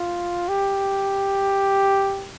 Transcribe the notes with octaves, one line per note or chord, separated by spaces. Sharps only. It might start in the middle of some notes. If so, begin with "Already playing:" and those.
Already playing: F4
G4